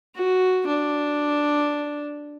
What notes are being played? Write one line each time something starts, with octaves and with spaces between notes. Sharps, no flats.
F#4
D4